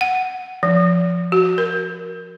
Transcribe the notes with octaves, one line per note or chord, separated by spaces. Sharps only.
F#5
F3
F#4
A#4